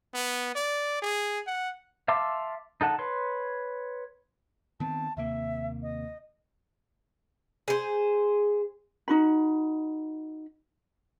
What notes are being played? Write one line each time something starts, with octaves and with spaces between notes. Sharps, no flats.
B3
D5
G#4
F#5
E5 F5 A5 C6 D6
D#4 A4 F#5 A5
B4 C#5 C6
D#3 B3 C4 A5
D#2 C3 A#3 E5
D#5
G#4 C5
D#4 F#4 B5